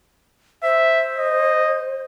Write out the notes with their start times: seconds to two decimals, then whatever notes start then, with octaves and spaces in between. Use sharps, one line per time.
0.63 C5 E5
1.18 D#5